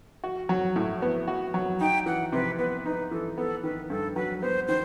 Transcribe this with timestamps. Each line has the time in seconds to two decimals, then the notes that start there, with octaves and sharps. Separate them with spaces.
0.24 F#4
0.49 F#3
0.76 A2
1.02 B3
1.28 F#4
1.54 F#3
1.81 D#4 G5
2.06 E3 F#5
2.32 C3 B4
2.59 B3 B4
2.85 D#4 B4
3.11 E3 A4
3.37 B3 A4
3.63 D#3 B4
3.90 G2 A4
4.16 F#3 B4
4.41 B3 C5
4.68 D#3 C5